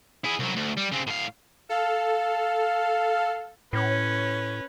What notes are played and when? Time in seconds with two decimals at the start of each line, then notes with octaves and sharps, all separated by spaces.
0.25 E4 G#4
0.40 C2 F#3
0.57 D2
0.78 G3
0.92 C#3 C4
1.07 A2 F5
1.69 A4 F5
3.73 A2 C#4 B4